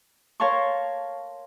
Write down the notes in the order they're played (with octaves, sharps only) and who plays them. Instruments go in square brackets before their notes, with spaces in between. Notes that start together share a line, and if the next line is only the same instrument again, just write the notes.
[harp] A#4 C#5 F5 A5 C6 C#6